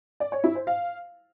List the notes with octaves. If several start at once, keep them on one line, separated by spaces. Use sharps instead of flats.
D5
C#5
E4
C5
F5